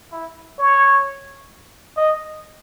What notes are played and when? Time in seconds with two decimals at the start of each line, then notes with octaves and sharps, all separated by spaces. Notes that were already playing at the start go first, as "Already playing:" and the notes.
0.12 E4
0.58 C#5
1.97 D#5